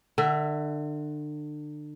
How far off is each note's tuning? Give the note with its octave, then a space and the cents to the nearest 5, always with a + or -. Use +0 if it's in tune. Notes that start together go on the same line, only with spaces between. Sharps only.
D3 +35 E5 +10